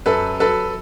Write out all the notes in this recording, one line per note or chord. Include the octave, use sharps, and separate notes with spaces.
F#2 A4 B4
F#3 A4 B4